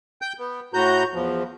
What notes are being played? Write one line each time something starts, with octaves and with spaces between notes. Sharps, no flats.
G5 G6
B3
A2 F#4 A#5 G6
E2 F3